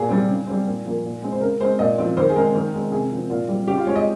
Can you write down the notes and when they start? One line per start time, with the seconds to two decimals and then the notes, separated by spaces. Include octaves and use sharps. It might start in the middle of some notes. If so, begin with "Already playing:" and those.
Already playing: A#2 G#4
0.09 G3 C4
0.28 C#3
0.47 G3 C4
0.66 A#2
0.85 F3 A#3
1.04 A#2
1.22 G#3 C4
1.32 C5
1.41 C#3 A#4
1.60 G#3 C4 C5
1.79 A#2 D#5
1.98 F3 C4
2.17 D#3 C5
2.29 G#4
2.36 G#3 C4 A#4
2.55 D#3
2.74 G#3 C4
2.92 C3 G#4
3.12 F3 C4
3.30 A#2 F4
3.48 G3 C4
3.68 C#3 G4
3.77 F4
3.87 G#3 C4 C#5
3.96 D#5